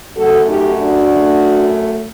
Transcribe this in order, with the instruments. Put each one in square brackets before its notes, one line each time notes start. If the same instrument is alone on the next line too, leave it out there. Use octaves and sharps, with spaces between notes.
[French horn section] F#2 F#3 A3 F#4 A4
D#4 G4
D4 F#4
F#2 F#3 A3